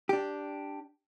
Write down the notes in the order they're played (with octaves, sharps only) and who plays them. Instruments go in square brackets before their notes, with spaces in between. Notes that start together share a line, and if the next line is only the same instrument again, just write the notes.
[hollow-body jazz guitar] D4 G4